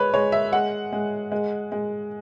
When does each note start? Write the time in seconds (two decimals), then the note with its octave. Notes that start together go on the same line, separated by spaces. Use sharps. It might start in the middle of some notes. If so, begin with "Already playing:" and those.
Already playing: G#3 B4 C#5
0.14 G#3 C#5
0.32 E5
0.52 G#3 F#5
0.92 G#3
1.32 G#3
1.72 G#3